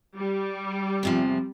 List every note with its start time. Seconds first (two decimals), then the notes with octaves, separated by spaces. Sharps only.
0.17 G3
1.03 E2 C3 F3